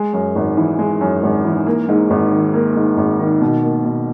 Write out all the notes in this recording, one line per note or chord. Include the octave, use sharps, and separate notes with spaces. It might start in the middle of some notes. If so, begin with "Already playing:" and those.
Already playing: G#3
F#2
G#1
E3
G#3
F#2
G#1
E3
A#3
G#2
G#1
D#3
A#3
G#2
G#1
D#3
B2
A#3
B2